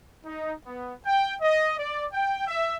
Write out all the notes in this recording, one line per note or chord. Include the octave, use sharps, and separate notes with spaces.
D#4
B3
G5
D#5
D5
G5
E5